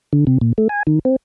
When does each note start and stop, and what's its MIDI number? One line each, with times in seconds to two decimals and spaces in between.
0.13 0.25 50
0.27 0.38 48
0.41 0.53 46
0.58 0.68 57
0.69 0.83 80
0.87 0.99 51
1.05 1.16 60